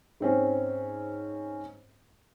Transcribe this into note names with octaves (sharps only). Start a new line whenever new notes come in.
G#2 C4 C#4